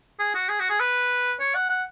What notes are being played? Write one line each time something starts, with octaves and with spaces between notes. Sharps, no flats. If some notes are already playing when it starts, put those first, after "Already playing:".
G#4
F#4
G#4
F#4
G#4
B4
C#5
F#5
F#5